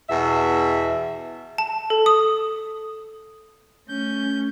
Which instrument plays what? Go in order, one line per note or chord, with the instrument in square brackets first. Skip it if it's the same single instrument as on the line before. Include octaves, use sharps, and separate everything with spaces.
[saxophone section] E2 B2 E5
[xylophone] A5
A4
D#6
[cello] A3 C#4 [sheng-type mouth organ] G6